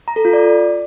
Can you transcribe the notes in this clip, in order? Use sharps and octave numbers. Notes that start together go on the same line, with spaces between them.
A#5
A4
F4
D5